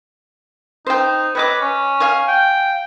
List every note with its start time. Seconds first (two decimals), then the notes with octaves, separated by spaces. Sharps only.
0.86 D#4 C5 G5
1.35 B4 C#5 D#5 D6
1.61 C#4
2.00 F5 G#5 C#6
2.28 G5